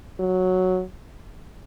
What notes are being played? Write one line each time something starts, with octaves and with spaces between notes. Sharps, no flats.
F#3